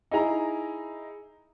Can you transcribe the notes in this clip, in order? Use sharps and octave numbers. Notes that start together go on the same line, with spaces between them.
D#4 E4 G#4 A#5